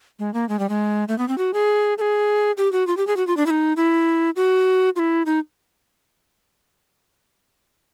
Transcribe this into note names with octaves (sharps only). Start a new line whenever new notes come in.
G#3
A#3
G#3
G3
G#3
A3
B3
C4
F#4
G#4
A4
G#4
G4
F#4
F4
G4
G#4
F#4
F4
D4
E4
D#4
E4
F#4
F4
E4
D#4